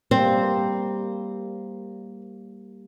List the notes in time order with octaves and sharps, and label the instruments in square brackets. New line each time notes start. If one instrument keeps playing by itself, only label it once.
[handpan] G3 A#3 [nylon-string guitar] C4